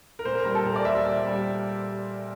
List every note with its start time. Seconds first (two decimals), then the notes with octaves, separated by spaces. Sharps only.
0.19 A#4
0.25 A#2 C5
0.35 A#4
0.45 G3 A#4
0.55 A4
0.65 A#2 A#4
0.76 D5
0.85 G3 E5
0.95 E5
1.05 A#2
1.27 G3